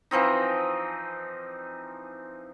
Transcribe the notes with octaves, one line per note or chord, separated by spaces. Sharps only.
E3 F3 C4 D#4